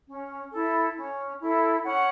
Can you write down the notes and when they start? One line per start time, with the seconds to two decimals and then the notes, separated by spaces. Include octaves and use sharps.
0.07 C#4
0.51 E4 A4
0.96 C#4
1.41 E4 A4
1.84 C#4 F#5